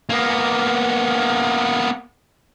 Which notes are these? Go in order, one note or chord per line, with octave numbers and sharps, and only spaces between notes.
A#3 B3